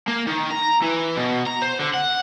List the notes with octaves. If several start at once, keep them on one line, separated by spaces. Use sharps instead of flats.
A#3
D#3
A#5
E3
B2
A#5
C5
D3
F#5